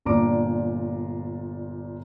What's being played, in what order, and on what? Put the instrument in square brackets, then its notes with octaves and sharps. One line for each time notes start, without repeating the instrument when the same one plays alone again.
[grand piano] G1 A#2 D4 A#5 D6 D7